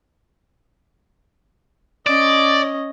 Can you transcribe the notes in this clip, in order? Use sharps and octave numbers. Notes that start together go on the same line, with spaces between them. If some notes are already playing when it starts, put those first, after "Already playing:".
C#4 D5 D#5